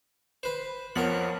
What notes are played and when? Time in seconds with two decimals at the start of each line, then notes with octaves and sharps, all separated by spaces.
0.43 B4 C5
0.96 F2 F3 B3 A#4 C#5 F#5